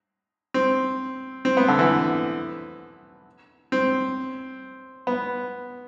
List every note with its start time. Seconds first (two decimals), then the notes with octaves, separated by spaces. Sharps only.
0.54 C4
1.45 C4
1.57 B3
1.68 D3
1.79 E3
3.72 C4
5.07 B3